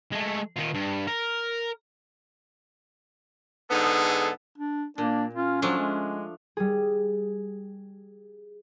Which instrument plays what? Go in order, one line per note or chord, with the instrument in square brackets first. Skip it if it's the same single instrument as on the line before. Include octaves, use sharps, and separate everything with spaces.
[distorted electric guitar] G#3 A3
D#3 F4
G2
A#4
[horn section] G#2 D3 B3 D#4 G#4 A4
[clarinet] D4
[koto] A#2 [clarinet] A#3 [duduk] D4
[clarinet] C#4 [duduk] F4
[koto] F3 A3 D4 [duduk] F#3
[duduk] G#3
[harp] G3 G#4